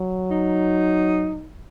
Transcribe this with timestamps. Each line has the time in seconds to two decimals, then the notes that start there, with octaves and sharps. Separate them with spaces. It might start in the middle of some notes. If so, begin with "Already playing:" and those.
Already playing: F#3
0.31 D#4